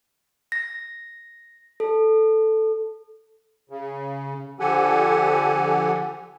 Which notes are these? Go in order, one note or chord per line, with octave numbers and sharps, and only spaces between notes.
A#6
A4
C#3
D3 F3 G4 A4 F#5 G#5